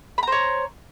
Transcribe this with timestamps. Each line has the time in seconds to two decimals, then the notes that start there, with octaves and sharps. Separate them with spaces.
0.18 B5
0.23 A#5
0.27 C5
0.32 C#5